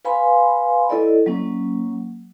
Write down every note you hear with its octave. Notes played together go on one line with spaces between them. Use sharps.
B4 F5 G#5 B5 C6
E4 A4 D5 D#5
F#3 A#3 C#4